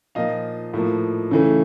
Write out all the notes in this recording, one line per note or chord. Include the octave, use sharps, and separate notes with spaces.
A#2 F3 A#3 D#5 F5
A2 F3 A#3
C#3 E3 A3